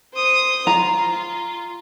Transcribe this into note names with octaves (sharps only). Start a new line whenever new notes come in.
C5 D#6
F4 A#5